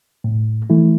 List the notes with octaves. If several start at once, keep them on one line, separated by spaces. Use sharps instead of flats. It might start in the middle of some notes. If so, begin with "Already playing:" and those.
A2
E3 A3 E4